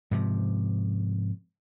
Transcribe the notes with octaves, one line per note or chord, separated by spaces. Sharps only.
G#2 C3 F3